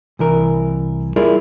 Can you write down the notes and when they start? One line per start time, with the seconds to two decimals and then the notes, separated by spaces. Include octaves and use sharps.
0.19 C2 E3 A#4
1.16 G3 E4 F4 G#4 A#4 D5